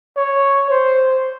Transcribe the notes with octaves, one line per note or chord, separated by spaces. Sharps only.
C#5
C5